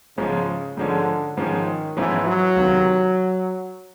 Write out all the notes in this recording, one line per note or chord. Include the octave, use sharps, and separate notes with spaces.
G#2 C#3 F3 G#3 C#4
G#2 D3 F3 G#3 C#4
G#2 D#3 F3 G#3 C#4
G#2 E3 F3 G#3 C#4
F#3
C#2 C3 D#3